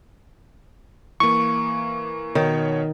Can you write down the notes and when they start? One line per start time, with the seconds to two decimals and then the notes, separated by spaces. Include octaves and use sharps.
1.20 E3 A#3 C#6
2.35 B2 D#3 C#5